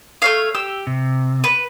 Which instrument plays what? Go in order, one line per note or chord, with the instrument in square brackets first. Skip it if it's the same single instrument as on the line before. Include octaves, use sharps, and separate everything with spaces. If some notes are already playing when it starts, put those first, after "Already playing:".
[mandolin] A3 C#5 F5
[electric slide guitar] G4 [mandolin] E6
[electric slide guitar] C3
[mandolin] B4